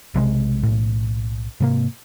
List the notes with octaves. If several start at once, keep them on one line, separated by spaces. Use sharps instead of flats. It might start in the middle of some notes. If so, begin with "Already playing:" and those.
B1 C3 E3 G#3
B1 A2
G#2 C3 A#3